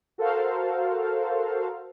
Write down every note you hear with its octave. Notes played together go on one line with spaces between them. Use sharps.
F#4 A4 A#4 C5 F5